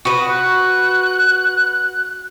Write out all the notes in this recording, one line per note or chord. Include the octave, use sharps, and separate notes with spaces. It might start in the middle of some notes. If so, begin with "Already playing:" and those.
F#4 B4 D#6
F#6